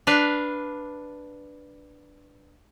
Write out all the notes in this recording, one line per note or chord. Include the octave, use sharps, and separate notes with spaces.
D4 B4 F5